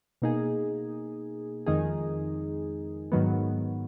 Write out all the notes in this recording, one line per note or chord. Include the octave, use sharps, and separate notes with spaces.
B2 A#3 D#4 G#4
F2 D#3 G#3 D#4 G#4
G#2 D#3 F#3 B3